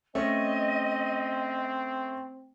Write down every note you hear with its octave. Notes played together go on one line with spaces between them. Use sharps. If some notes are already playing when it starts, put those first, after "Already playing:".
A3 C4 C#4 D#5